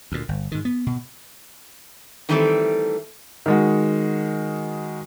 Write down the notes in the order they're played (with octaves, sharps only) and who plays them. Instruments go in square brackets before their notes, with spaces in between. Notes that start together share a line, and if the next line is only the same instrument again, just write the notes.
[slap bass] D2 A#2
G1
G#2 D#3
B3
B2
[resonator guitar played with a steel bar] D#3 E3 G3 A3 C4 A4
[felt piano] D#3 G#3 F#4